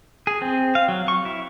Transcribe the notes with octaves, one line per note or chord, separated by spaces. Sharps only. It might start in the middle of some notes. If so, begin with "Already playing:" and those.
G#4
C4
F5
F#3
C#6
E4